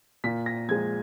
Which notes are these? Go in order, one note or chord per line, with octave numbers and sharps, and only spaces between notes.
A#2 B6
A#6
F3 G#3 G#6